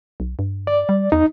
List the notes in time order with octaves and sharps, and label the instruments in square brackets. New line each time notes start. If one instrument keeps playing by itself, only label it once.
[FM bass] B1
G2
[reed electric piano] D5
[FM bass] G3
[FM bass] E2 [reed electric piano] D#4